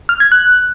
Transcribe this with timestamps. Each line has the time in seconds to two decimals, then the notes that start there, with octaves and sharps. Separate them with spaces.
0.09 F6
0.20 G#6
0.32 F#6